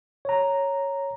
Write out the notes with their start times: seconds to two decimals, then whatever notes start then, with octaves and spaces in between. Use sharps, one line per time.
0.25 C#5 A#5